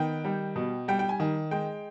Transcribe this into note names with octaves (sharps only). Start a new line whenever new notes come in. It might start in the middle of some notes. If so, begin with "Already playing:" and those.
Already playing: D#3 B3 G5
G3
B2
G3 G5
G5
G#5
D#3
G#3 G5